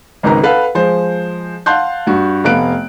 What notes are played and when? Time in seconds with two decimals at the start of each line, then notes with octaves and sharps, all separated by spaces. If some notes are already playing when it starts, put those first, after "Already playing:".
0.23 G#1 C#2 D#4 A#4 B4 A#5
0.43 A4 B4 F5 F#5
0.75 F3 G#3 C5
1.66 F5 F#5 A5 C6 F#6 G6
2.07 G2 F#4
2.44 F1 A3 B3 F5 F#6 D7